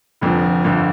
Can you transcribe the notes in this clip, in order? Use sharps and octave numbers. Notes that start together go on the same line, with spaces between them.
F1 F2 D3 F3
G1 F2 D3